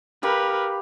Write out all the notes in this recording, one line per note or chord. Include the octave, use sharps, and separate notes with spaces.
G4 A#4 B4 F5 B5